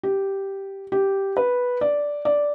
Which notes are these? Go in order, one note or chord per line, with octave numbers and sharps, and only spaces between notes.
G4
G4
B4
D5
D5